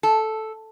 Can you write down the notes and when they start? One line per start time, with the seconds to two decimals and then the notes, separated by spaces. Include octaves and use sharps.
0.03 A4